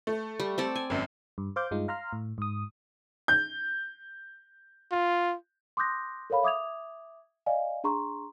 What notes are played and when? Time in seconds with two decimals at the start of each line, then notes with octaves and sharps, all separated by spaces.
0.07 A3
0.40 G3
0.58 C4 A4 D5
0.75 G#5
0.90 G#1 F#2
1.38 G2
1.56 C5 F5 D6 G6
1.71 G2 G#3 D#4 F4
1.88 F5 A#5 C6 F6
2.13 A2
2.38 G#2 D#6
3.28 G6
4.92 F4
5.77 C6 D6 D#6 F#6 G6 A#6
6.30 A4 A#4 C#5 F5 B5
6.43 E5 D6 D#6 G#6 F7
7.46 D5 D#5 F5 G#5
7.84 D4 G#4 A#5 C6 C#6